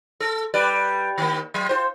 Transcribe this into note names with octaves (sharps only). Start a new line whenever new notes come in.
A4
G3 B4 D5
D#3 A#3
F#3
F4 F#4 C5